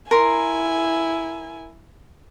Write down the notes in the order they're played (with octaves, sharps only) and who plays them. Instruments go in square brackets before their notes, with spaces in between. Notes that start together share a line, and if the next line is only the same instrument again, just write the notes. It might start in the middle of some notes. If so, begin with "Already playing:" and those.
[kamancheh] E4 G#5 [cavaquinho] A#4 C6